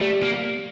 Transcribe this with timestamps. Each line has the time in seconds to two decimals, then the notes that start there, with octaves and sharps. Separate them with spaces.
0.01 G3 A3
0.23 A#3